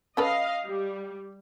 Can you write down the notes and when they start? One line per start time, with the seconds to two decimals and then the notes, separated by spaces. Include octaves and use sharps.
0.17 C#4 A4 B4 D#5 F5
0.66 G3